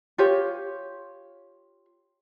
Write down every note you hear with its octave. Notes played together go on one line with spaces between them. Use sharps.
F4 G4 C#5